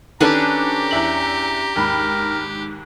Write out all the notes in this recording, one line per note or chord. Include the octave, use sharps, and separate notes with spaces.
D#3 C#4 D4 G4 A4 B4 A#5
E2 E5 F#7
D#2 G#2 A#4 B5